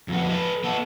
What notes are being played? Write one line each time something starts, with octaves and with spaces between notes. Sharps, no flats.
F2 B3
A4 B4
B3 A4